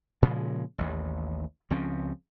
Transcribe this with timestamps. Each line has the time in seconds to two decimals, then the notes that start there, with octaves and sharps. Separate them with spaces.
0.22 A#2 C#3 F3 G#3
0.78 A1 D#2
1.70 C#2 F3 C4 C#4